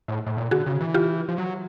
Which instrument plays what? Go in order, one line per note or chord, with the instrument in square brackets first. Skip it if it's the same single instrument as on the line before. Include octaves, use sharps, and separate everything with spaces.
[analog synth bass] A2
A2
A#2
[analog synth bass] D3 [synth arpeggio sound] F#4 G#4
[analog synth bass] C#3
E3
[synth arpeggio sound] F4 G4
[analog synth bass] F3
F#3